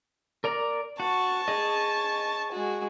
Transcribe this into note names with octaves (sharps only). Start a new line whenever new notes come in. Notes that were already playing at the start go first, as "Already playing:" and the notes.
A#4 D5 A#5
F#4 A5 C#6
G#4 D#5
G#3 F#4